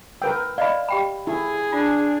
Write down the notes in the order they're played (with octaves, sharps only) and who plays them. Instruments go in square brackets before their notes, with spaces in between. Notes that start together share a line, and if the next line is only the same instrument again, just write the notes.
[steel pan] A#4 B4 G5 [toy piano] E6
[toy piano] D5 D#5 B5 [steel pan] F5
[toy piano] G4 G5 B5
[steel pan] E4 [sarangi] G#4
[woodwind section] D4 [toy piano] F4